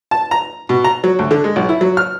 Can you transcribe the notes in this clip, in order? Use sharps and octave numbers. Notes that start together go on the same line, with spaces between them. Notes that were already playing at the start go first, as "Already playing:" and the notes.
A5
A#5
B2
A#5
F#3
D2
D3
G#3
B1
E4
F#3
F6